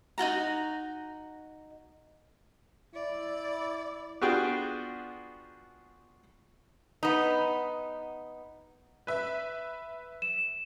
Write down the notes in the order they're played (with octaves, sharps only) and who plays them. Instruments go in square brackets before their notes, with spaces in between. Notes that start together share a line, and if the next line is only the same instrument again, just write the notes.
[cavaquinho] D#4 F4 F#4 A#5
[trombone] E4 [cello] D5
[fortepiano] B3 D4 F4 F#4 G#4 G5
[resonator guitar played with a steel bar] B3 D#4
[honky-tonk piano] B4 E5
[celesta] E7